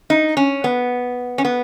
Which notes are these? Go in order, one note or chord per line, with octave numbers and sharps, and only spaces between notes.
D#4
C#4
B3
C#4
B3